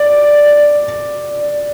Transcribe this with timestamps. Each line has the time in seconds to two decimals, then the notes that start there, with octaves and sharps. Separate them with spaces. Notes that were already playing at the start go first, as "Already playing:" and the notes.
Already playing: D5